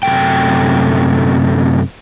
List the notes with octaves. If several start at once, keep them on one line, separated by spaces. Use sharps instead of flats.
F#2 C3 A3 G5